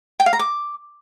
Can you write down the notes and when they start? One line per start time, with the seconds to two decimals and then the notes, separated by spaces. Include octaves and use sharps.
0.20 G5
0.26 F5
0.33 A#5
0.39 D6